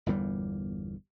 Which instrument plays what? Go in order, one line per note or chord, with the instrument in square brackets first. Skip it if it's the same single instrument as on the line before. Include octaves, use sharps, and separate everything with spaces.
[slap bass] G1 E2 A#2 G3